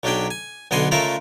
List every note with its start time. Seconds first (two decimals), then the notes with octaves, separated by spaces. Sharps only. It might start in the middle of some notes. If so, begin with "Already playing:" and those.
0.03 B1 F#3 D4 G4 G#4 G5
0.31 G#5
0.71 B1 D3 B3 D#5 G#5 C6
0.91 C#3 G#3 A3 F4 A#4 E5